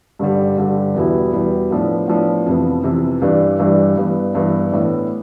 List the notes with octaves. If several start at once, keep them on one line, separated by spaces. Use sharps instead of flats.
G2 D3 G3
G2 D3 G3
E2 B2 G3 B3 E4
E2 B2 G3 B3 E4
A2 F3 B3 D4
A2 F3 B3 D4
F2 C3 E3 B3
F2 C3 E3 B3
G2 E3 G3 D4
G2 E3 G3 D4
G2 E3 B3
G2 E3 B3
A2 E3 B3 D4